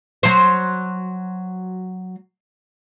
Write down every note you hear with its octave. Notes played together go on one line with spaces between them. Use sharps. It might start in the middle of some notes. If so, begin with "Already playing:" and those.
F#3 C5